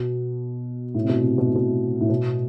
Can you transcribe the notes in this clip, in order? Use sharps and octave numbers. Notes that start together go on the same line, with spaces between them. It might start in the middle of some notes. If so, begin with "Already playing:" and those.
Already playing: B2
A2
C3
B2
C3
B2
A2
B2
A2
B2